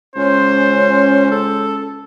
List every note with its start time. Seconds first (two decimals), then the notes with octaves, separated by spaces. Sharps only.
0.16 C#2 C#4 C5
1.31 A4